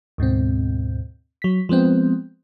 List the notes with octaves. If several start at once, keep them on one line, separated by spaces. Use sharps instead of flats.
D2 G#2 B2 C4
F#3 B6
F3 G#3 B3 C4